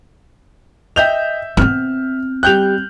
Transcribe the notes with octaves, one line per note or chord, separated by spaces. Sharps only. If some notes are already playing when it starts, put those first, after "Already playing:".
D#5 E5 G5 G6 F7
B3 C4 F6
G3 G5 F#6 G6 F7